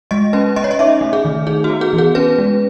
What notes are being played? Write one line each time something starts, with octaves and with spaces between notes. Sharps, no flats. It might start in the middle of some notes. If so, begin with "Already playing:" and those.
G#3 D#5
C#4 B4
C#4 D#5
C#5
D#5
D#4 E5
A3
G#4
D#3
D#4 G#4
F#4
B3
G#4
E3
G#4
C#4 B4
G#3